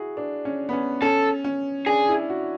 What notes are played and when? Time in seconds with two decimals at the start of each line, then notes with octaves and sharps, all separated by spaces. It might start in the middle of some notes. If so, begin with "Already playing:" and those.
Already playing: E4 F#4 G#4
0.17 D4
0.45 C#4
0.69 B3
0.73 C#4
1.02 C#4 A4
1.44 C#4
1.86 D4 G#4
2.08 E4
2.29 F#4